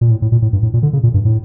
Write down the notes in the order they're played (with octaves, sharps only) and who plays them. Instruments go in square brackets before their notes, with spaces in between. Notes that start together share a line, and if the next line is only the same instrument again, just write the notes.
[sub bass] A#2
A2
A2
A#2
A2
G2
A2
A#2
D3
C#3
A#2
G2
A2